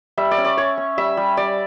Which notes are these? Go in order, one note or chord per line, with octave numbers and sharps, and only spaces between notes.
G3 E5
D5
C#4
D5
C#4 C#5
C#4
G3 E5
G3
G3 D5